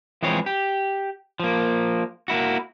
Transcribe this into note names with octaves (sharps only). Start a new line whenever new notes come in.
E3 F3 G#3 C4 G#4 C#5
G4
F3 A#3
A#3 E4 F#4